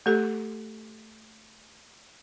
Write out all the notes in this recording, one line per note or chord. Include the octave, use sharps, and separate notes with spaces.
A3 G4 A4